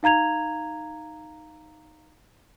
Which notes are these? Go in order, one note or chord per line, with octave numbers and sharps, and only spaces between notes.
D#4 F5 A#5 G#6 F7